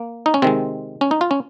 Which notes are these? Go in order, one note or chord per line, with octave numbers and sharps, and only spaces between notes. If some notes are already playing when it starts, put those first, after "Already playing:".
Already playing: A#3
D#4
C#4
C3 D#3 G#3 C4
C#4
D#4
F4
C#4